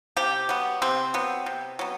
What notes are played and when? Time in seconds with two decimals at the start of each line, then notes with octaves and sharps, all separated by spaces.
0.17 C3 G4
0.49 F#3 B3
0.82 C3 C4
1.14 F#3 B3
1.46 C3
1.79 F#3 B3